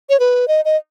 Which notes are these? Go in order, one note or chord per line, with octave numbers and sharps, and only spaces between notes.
C#5
B4
D#5
D#5